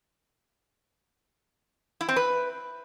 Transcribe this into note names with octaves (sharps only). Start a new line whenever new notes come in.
E4
C4
B4